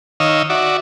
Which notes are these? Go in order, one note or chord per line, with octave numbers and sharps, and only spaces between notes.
D#3 C#5 D#5 F5 E6
F#4 D5 E5